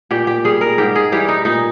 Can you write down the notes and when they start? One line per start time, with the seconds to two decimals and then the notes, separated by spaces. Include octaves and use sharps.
0.11 A#2 G4
0.27 G4
0.44 G3 G#4
0.61 A#4
0.78 G#2 G4
0.96 G#4
1.12 E3 G3 G4
1.28 D#4
1.45 A#2 D#4